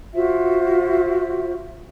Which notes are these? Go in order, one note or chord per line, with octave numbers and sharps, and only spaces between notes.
F4 F#4 C5 E5